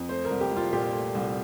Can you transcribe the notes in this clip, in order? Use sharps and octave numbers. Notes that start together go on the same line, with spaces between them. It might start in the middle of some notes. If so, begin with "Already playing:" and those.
Already playing: F2
A3 C5
A#4
C2
G4
C2
F4
A#2 G4
A3
C2